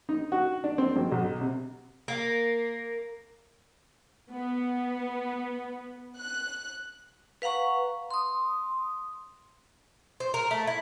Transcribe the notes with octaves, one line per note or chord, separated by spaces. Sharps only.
D#4
F#4
D4
C4
G#1
B1
C3
A#3
B3
F#6
B4 F5 F#5 A#5 C#6
C6 D#6
C5
A#4
A3
E4